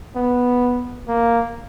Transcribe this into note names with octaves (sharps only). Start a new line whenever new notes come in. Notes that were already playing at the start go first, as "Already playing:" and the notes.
B3
A#3